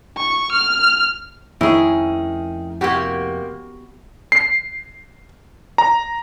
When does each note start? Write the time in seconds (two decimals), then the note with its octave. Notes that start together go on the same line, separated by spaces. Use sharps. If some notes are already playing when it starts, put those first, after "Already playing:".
0.18 C#6
0.52 F6
1.61 F2 D#3 F3 A3 C#4 E4 G#4
2.81 C3 A#3 B3 F#4 G4
4.32 C7
5.78 A#5